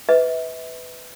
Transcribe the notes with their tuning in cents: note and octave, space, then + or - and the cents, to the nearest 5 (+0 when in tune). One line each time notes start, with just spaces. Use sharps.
B4 +15 E5 -40